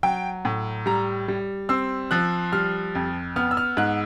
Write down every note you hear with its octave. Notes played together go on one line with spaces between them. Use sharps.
F#3 G5
A2
G3 A#5
G3
C4 E6
F3 F#6
G3 F6
F2
B3 F6
E6
F6
G#2 F#6